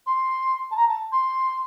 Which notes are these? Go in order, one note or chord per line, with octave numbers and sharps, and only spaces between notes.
C6
A5
A#5
A5
C6